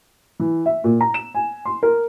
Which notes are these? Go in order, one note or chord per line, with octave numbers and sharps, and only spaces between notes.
E3
E5
A#2
A#5
E7
G#5
C6
A#4